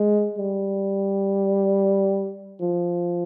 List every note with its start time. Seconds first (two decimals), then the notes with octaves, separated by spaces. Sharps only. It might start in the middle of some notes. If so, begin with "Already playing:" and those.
Already playing: G#3
0.37 G3
2.61 F3